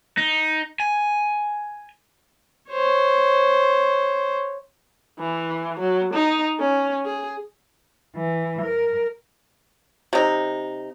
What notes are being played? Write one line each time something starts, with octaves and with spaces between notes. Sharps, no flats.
D#4
G#5
C5 C#5
E3
F#3
D#4
C#4
G#4
E3
A#4
C3 D#4